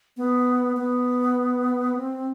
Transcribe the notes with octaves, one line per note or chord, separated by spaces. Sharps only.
B3
B3
C4